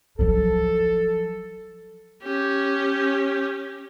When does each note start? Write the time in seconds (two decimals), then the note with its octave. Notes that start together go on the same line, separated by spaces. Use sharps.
0.19 F3 F#3 A4
2.22 C#4 G4